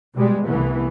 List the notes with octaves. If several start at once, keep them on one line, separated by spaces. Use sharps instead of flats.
B2 G3 G#3
C2 E3 A3 B3